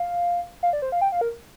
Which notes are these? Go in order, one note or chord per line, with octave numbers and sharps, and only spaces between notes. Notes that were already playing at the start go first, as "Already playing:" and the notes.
Already playing: F5
F5
D5
C5
F5
G5
F5
A#4